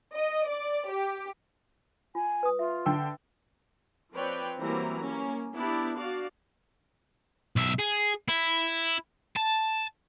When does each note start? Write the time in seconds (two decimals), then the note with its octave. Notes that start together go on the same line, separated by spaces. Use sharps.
0.15 D#5
0.48 D5
0.89 G4
2.15 F4 G#5
2.43 B4 D#6
2.59 F4 E5
2.86 D3 G5 E6
4.13 F3 C4 B4 C#5 D5 G5
4.61 E3 F#3 G3 A#3 C4 A#5
5.04 A#3 C#4
5.54 B3 D4 E4 G4 D5
5.96 F#4 D5 F5
7.56 B1 E5
7.79 G#4
8.29 E4
9.36 A5